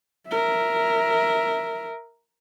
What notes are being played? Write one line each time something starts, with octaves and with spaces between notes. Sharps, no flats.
A#4 E5